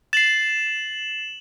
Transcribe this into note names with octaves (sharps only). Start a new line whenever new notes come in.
A6 C7 E7 F#7